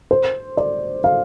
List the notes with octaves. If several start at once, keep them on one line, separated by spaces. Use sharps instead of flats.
C5
D5
F5